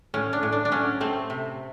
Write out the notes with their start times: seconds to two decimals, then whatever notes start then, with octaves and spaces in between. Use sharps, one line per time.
0.14 A2 C#4
0.33 D4
0.43 A2
0.52 D4
0.65 D4
0.72 F#3 C#4
1.01 A3 C4
1.30 C3